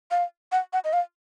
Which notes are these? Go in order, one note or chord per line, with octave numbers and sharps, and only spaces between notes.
F5
F#5
F#5
D#5
F5